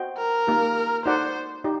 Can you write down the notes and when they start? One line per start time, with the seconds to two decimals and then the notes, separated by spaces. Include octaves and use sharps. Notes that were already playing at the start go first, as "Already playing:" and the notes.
Already playing: F#4 C5 D#5 G5
0.18 A#4
0.47 A#3 D#4 G4
1.06 D#4 F#4 A4 C5 D5 F#5
1.64 D#4 G4 D5